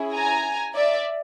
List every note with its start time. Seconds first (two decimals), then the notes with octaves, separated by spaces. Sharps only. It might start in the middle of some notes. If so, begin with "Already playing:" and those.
Already playing: C#4 E4 G#4
0.15 G#5 A#5
0.75 D5 E5